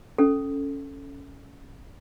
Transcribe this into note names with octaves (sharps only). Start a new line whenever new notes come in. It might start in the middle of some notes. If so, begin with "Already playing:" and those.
C#4 A4